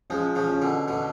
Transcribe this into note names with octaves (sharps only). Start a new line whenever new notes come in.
F3 G#3 C#4
C#3 F3
C#4
B2 D3
B2 D3 A3